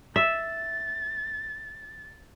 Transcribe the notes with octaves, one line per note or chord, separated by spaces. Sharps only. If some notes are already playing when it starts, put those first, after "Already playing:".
E5 A6